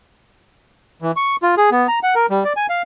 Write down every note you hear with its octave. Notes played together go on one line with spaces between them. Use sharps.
E3
C#6
F4
G#4
B3
A#5
F#5
A#4
G3
D5
G#5
F5